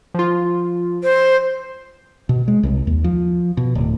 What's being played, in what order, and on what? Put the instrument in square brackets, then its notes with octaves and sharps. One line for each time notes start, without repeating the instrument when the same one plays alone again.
[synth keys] F3 F4
[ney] C5
[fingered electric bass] B2
G#3
C2
D#2
F3
B2
D1